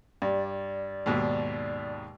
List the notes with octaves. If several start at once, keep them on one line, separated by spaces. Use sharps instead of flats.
G2 D5
D#2 G#2 B2